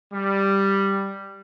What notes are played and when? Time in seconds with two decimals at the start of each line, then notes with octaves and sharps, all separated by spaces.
0.13 G3